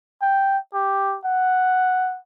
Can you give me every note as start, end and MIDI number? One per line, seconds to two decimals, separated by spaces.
0.22 0.58 79
0.74 1.17 67
1.25 2.18 78